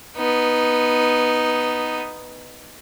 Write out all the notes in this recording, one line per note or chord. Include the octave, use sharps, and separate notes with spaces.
B3 D#4